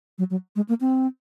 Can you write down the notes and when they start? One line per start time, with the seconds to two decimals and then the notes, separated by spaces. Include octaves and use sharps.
0.18 F#3
0.30 F#3
0.56 G#3
0.69 A#3
0.81 C4